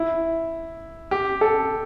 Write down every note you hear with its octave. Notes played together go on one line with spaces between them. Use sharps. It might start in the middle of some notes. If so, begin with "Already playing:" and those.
Already playing: E4
G4
A4